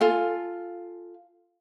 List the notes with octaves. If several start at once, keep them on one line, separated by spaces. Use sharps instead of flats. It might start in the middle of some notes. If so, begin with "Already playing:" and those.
F4 A4 G#5